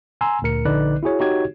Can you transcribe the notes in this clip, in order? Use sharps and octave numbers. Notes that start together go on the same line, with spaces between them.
G#5 A#5 C6 E6
D2 A#2 A#4 C#7
A#1 D3 D#4 B4 D5 F#6
E4 F#4 G#4 C#5
D#4 F#4 G4 C#5 G#6